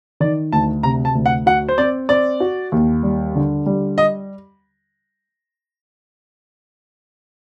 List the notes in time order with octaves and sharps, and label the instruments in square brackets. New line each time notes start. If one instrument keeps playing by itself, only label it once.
[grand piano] D#3 [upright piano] D5
[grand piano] D2 [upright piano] A5
[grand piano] C3 [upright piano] A#5
[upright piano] A5
[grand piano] D2
[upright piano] F#5
[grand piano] F#4 [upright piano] F#5
[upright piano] C5
[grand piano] C4 [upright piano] D5
[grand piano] C4 [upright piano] D5
[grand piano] F#4
D#2
G3
D3
G3
[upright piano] D#5